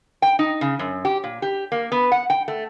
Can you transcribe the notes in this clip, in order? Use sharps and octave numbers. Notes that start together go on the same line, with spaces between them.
G5
D#4
C#3
F#2
G4
A#2
G4
A#3
B3
F#5
G5
A3